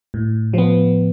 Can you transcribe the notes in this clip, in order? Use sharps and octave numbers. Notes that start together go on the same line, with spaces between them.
A2
F3 B3